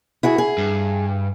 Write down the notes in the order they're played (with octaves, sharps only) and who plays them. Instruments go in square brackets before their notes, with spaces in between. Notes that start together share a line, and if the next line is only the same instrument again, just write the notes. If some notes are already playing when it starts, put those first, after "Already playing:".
[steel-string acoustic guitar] E4 F#4 G#4
G#4
[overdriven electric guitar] G2